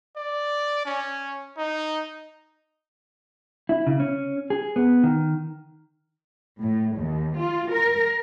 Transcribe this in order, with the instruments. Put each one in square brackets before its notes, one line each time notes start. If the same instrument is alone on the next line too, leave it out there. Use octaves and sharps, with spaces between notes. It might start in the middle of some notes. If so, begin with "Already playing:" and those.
[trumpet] D5
C#4
D#4
[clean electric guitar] E4
C#3
C#4
G#4
B3
D#3
[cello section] A2
D#2
F4
A#4